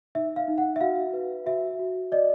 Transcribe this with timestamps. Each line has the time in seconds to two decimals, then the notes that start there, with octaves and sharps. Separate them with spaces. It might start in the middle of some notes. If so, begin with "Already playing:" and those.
0.15 D#4 E5
0.36 F5
0.48 D#4
0.58 F#5
0.76 E5
0.81 F#4 F5
1.13 B4
1.46 F#4 E5
1.79 F#4
2.12 D5 D#5